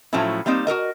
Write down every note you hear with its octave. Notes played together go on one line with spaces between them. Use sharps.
A2 F3 F#3 A3 C#4 E4
G3 A#3 C4 D#4 D5
F#4 A4 A#4 D#5